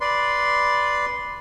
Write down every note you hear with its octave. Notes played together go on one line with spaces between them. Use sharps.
B4 D5 C6